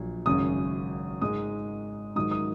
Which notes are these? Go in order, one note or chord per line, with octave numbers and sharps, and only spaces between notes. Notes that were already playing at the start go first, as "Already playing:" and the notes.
Already playing: A#1 A#2 F#3
G#1 F#2 C#3 D#6
G#2 G#3 D#4 D#6
G#2 D#3 F#3 D#4 D#6
D#6